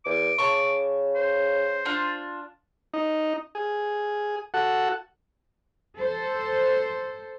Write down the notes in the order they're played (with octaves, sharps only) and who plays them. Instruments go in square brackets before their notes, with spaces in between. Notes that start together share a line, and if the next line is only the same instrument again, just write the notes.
[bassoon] E2 [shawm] D6
[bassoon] C#3 [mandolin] A5 C#6
[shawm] C5
[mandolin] D4 F4
[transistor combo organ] D#4
G#4
F#4 A4 F#5
[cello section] A4 C5